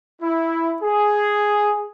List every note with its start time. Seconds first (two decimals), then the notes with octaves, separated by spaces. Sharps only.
0.21 E4
0.81 G#4